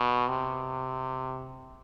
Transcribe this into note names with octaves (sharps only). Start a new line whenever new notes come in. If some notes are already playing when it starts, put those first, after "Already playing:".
Already playing: B2
C3